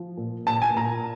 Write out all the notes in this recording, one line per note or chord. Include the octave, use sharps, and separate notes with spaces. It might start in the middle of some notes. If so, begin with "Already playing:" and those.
Already playing: F3
A#2
A#2 A5
G#5
A#2 A#5